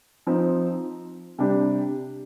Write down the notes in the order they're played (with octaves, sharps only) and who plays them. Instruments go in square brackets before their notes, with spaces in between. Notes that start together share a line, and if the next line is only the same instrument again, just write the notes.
[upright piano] F3 C4 D#4
C3 G3 D4 G4